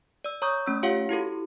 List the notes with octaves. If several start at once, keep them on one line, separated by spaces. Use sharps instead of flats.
D5 E6
C#5 A#5 C#6 D#6 G6
A3 C#4 E6
F4 G4 C#5 F5 F#5
E4 F#4 G4 A4